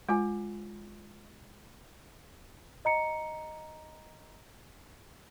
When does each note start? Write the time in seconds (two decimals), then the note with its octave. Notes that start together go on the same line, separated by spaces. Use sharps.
0.09 G#3 F4 G#5
2.85 D#5 A#5 C#7